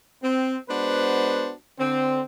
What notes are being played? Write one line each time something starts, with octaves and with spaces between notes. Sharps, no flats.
C4
G#3 B3 D4 F#4 B4 C5
D3 C4